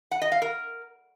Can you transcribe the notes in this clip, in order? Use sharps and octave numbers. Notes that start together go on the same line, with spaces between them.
F#5
D#5
F5
A#4